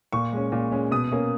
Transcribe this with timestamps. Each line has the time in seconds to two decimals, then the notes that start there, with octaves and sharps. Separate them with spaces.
0.13 A#2 C#6
0.33 G#3 C#4
0.52 A#2
0.72 G#3 C#4
0.91 B2 D#6
1.12 A#3 C#4